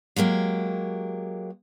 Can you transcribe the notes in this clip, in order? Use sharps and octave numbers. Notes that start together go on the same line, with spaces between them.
F#3 G#3 A#3 G4